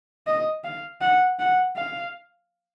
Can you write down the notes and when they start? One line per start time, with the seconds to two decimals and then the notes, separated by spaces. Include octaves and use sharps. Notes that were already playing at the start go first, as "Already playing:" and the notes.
0.27 D#5
0.64 F5
1.01 F#5
1.39 F#5
1.76 F5